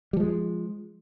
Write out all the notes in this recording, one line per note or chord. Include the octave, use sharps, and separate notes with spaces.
F3 G3 G#3